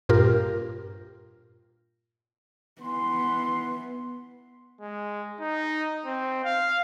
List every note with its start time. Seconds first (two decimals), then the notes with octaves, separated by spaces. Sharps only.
0.09 G2 A#2 F4 G4 A#4
2.82 E3 B3 C6
4.81 G#3
5.40 D#4
6.06 C4
6.45 F5